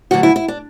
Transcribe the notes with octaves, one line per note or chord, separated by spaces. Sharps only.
D2 D3 F#3 F#4
E4
E4
D4